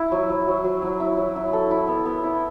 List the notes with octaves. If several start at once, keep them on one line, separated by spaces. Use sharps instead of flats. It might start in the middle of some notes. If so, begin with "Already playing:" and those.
Already playing: E4
F#3
F#3
F#3
F#3
F#3
E4
F#3
E4
A4
E4
B3
B3
E4